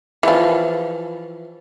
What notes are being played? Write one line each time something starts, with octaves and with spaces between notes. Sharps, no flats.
E3 F3